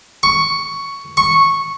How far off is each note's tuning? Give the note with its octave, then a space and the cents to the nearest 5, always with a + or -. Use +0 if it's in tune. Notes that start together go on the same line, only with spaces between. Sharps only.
C#6 +5
C#6 -10